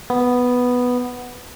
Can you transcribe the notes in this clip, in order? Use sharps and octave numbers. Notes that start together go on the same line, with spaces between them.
B3